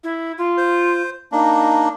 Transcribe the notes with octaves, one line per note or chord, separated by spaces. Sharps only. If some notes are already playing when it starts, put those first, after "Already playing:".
E4
F4
C5
A#3 D4 D#4